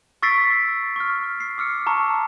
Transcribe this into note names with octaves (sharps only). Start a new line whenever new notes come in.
C#6 E6 A6 B6 C7 D7
C#6 F6
C7
D6 E6 F6 C#7
A5 A#5 C#6